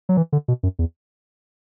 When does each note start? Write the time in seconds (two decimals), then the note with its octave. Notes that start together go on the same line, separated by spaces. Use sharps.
0.09 F#3
0.17 E3
0.32 D3
0.48 B2
0.63 F#2
0.79 E2